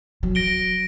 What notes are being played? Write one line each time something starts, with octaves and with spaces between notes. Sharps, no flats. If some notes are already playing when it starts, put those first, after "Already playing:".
F#3
A#6 D7 G7